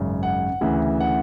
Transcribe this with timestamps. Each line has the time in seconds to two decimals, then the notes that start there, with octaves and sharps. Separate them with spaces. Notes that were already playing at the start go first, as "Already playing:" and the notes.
Already playing: G#1 F#2 C#3
0.23 F#5
0.61 D2 C#3 E3
1.00 F#5